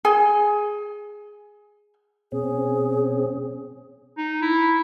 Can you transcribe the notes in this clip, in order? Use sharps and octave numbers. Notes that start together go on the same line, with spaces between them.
G#4 G#5
B2 C4 C#4 G#4
D#4
E4